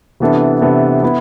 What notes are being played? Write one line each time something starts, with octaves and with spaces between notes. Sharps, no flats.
C3 E3 B3 D4 A4
C3 E3 B3 D4 A4
B3 E4